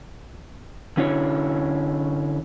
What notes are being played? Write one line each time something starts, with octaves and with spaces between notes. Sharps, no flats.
D3 C#4 E4 C#5